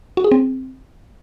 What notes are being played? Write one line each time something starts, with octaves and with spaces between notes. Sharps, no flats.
F#4
G#4
C4